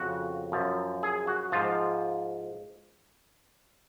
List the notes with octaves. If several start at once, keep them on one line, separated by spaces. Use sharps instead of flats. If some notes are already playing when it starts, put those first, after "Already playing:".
Already playing: F2 C#3 F#4
F#2 F3
G#4
F#4
G#2 F3 F4